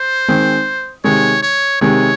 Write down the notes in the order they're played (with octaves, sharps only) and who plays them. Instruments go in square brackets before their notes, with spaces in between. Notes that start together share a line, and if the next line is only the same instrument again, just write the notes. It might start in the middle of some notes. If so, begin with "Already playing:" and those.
Already playing: [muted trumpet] C5
[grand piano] D#3 G#3 C4
[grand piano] C3 D#3 G#3 [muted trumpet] C#5
[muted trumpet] C#5
[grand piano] C3 D#3 G#3 [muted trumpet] C#5